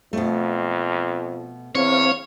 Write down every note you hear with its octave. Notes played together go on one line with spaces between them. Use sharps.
F2 B2 A3
E2 C4 C#5 F5